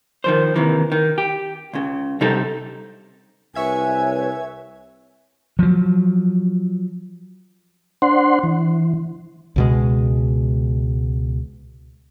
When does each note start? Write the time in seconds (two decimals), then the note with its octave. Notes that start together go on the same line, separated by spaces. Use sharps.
0.24 D#3 F3 C5
0.56 D#2 C3 D#3 E3
0.92 D#3
1.18 G4
1.73 C#2 C#3
2.21 C3 G3 D#4 G4 A4
3.55 C2 B4 C#5 E5 G#5 G#6
5.59 F3 F#3
8.02 D4 C5 F#5 C6
8.43 E3
9.56 C#2 B2 G#3